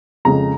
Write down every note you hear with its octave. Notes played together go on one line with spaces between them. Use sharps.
F2 C#3 G#3 A#5